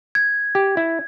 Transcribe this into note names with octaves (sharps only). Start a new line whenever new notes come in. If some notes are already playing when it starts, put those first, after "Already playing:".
G#6
G4
E4